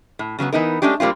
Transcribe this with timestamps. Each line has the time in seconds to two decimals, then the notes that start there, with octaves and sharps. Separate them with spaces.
0.19 A2
0.39 C#3 F#3 A#3 B3
0.53 E3 B3 D#4 A#4
0.82 G#3 A3 C#4 D4 G4
1.00 A2 G3 A#3 C4 F4